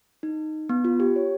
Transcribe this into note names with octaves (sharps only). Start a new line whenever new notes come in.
D#4
B3
F4
G4
C#5